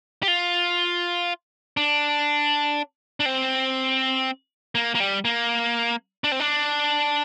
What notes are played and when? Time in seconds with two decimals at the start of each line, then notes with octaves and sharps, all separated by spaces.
0.23 G4
0.28 F4
1.77 D4
3.20 D4
3.26 C4
4.75 A#3
4.95 A#3
5.00 G3
5.25 A#3
6.24 D4
6.32 C4
6.40 D4